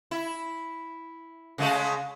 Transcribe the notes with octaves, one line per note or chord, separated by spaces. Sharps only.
E4
C#3 G#3 A3